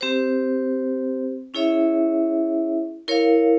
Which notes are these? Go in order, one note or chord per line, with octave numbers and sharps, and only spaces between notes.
C4 G4 C5
C#4 E4 G#4 C#5 E5
E4 A#4 C#5 F5